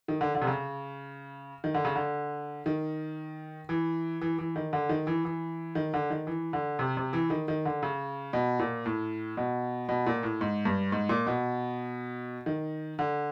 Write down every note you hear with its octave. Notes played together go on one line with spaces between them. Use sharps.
D#3
D3
D3
C3
C#3
D#3
D3
C#3
D3
D#3
E3
E3
E3
D#3
D3
D#3
E3
E3
D#3
D3
D#3
E3
D3
C3
C3
E3
D#3
D#3
D3
C#3
B2
A#2
A2
B2
B2
A#2
A2
G#2
G2
G#2
A#2
B2
D#3
D3